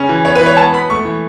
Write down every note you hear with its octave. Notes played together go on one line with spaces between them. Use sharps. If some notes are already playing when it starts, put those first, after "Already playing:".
Already playing: C#3 C#4
E3
B3 C#5
B4
E3
C#5
B3 A5
B3 B5
A3 C#6
E3